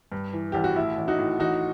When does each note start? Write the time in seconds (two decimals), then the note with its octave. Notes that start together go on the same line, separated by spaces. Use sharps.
0.12 G2
0.33 E3
0.52 A1 G4
0.64 F#4
0.76 A2 E4
0.97 A1
1.08 D#4 F#4
1.19 A2
1.40 A1 D#4 F#4